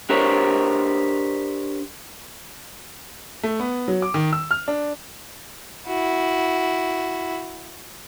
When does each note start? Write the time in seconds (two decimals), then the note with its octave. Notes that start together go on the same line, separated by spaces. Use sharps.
0.10 D4 G4 A#4 C5 C#5
3.43 A3
3.59 B3
3.88 F#3
4.02 D6
4.14 D#3
4.33 E6
4.51 F6
4.68 D4
5.87 E4 F#4